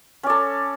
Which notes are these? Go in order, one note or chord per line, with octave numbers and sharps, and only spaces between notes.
C#4 A4 D5